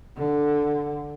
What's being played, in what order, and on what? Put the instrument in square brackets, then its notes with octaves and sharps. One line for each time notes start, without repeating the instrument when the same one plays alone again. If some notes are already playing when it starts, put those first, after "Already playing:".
[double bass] D3